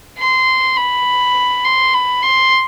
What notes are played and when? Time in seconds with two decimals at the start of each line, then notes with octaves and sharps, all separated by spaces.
0.18 C6
0.76 B5
1.64 C6
1.93 B5
2.22 C6